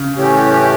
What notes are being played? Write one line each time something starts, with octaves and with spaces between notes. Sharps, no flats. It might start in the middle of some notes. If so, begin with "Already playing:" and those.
Already playing: C#3
A2 E3 A3 C#4 G4